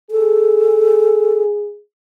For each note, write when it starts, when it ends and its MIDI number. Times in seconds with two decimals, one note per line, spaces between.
0.11 1.78 68
0.11 1.43 69